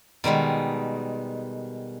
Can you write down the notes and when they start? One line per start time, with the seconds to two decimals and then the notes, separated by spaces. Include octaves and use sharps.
0.24 B2 D#3 G3 G#3